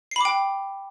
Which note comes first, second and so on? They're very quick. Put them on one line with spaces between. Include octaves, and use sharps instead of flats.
C7 B5 D6 G5